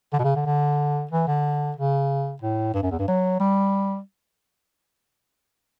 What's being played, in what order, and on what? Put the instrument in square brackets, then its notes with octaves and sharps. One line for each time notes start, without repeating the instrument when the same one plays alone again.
[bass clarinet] D3
B2
C#3
D3
D3
E3
D3
C#3
A2
G2
F#2
E2
G2
F#3
G3